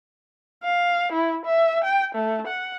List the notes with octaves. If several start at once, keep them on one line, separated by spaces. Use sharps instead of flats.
F5
E4
E5
G5
A3
F#5